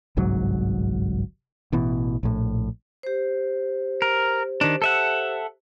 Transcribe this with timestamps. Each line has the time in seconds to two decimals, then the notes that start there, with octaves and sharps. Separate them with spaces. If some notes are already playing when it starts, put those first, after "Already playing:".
0.17 G1 C2 G#2 F#3
1.73 A1 B2 E3
2.23 A#1 A2
3.03 G4 C5
4.02 A#4
4.61 D#3 D4
4.82 A4 E5 F#5